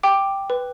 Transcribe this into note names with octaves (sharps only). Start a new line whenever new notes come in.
G5 D6
B4